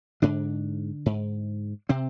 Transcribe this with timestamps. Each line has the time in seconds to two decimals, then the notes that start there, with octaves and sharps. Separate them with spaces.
0.22 G#2 D3 D4
1.06 G#2
1.89 C3 C4